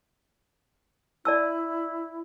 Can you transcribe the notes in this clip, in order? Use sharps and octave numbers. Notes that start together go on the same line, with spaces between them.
E4 D5 A5 E6